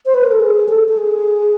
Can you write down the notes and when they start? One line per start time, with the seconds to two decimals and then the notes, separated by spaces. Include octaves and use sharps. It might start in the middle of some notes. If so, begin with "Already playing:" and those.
0.06 C5
0.14 B4
0.23 A#4
0.31 A4
0.40 G#4
0.69 A4
0.88 A4
0.97 G#4